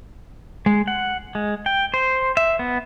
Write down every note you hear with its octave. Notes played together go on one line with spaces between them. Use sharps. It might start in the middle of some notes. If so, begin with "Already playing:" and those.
G#3
F#5
G#3
G5
C5
E5
B3